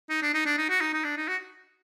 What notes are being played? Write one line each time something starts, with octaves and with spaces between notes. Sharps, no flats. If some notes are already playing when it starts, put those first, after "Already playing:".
D#4
D4
D#4
D4
D#4
F#4
D#4
D#4
D4
D#4
F#4